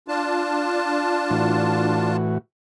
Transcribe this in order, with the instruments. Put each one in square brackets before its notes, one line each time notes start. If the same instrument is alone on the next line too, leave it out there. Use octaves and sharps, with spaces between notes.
[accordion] D4 F4 A5
[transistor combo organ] A2 E3 F#4